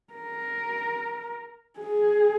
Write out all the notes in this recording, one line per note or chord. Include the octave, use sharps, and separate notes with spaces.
A#4
G#4